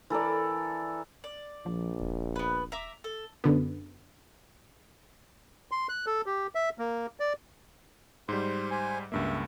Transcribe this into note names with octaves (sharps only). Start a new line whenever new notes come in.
E3 A4 A#4 D5
D5
A#1 F3
D#1
B3 B4
E5 A#5 D6
A4
F#2 D3 B3
C6
F#6
A4
G4
E5
A#3
D5
G#2 G3 C5 C6
C5 G#5
C#2 G2 A#3 E5